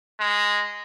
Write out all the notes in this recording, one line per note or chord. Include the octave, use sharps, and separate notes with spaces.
G#3